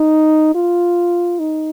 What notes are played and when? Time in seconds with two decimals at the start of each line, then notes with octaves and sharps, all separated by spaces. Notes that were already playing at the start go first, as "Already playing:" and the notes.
Already playing: D#4
0.55 F4
1.39 D#4